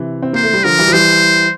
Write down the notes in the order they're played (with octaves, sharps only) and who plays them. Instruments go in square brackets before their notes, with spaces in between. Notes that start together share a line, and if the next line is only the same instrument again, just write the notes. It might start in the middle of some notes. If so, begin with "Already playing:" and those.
Already playing: [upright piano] C3 E3
C4
[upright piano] A#3 [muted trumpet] C5
[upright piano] A3
G3
[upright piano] D3 F3 [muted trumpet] A#4
[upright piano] E3 G3
F3
[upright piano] E3 G3 [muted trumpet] C5